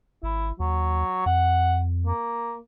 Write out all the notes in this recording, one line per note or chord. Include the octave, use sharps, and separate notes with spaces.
G#1 E4
D#2 F#3
F2 F#5
A#3